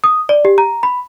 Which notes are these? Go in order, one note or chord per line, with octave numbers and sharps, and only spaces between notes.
D#6
D5
G4
A#5
B5